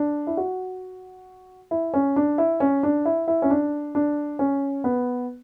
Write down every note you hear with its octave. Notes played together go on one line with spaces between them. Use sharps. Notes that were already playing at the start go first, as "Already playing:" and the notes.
Already playing: D4
E4
F#4
E4
C#4
D4
E4
C#4
D4
E4
E4
C#4
D4
D4
C#4
B3